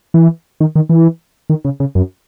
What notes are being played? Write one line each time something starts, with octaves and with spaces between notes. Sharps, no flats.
E3
D#3
D#3
E3
D#3
C#3
C#3
F#2